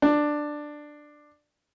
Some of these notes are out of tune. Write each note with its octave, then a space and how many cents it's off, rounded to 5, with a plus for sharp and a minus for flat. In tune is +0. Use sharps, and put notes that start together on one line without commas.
D4 +10